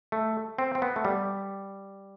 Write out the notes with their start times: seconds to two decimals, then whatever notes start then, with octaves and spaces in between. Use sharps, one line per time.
0.12 A3
0.59 C4
0.75 C4
0.82 B3
0.96 A3
1.05 G3